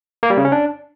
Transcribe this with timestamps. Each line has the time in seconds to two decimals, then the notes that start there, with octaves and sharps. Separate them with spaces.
0.23 A#3
0.30 G3
0.37 C#3
0.45 C#4
0.52 D4